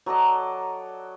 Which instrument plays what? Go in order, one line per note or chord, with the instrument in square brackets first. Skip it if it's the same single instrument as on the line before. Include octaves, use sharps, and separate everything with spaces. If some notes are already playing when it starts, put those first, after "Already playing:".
[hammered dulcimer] F#3 A4 D5 D#5